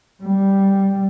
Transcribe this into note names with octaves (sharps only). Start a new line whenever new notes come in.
G3